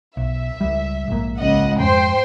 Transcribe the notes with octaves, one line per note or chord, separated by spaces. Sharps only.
B1 E5
C#2 G3
A#1 G#2 A#3
C#2 D#5 F#5
F2 G#2 G#3 C5 G5 C6